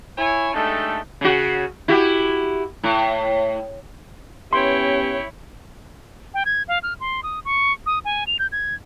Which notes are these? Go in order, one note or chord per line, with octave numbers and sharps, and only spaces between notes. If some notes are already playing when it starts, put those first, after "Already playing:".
E4 C#5 G#5
G#3 A3 D4 D#4 G4 A4
C#3 F#4
E4 F#4 G4
A2
B3 C#4 E4 G4 C#5 G5 C6
G5
G#6
F5
F6
C6
D#6
C#6
D#6
G#5
F7
G6
G#6